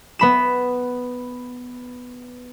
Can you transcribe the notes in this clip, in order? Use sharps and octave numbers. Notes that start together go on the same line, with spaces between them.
B3 B5 E7